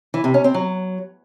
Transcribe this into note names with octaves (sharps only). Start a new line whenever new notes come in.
E3
C3
C#4
C4
F#3